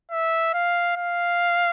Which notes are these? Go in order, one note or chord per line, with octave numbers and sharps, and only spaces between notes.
E5
F5
F5